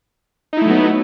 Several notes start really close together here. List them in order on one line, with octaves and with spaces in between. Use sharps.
D#4 E4 A3 F#3 B3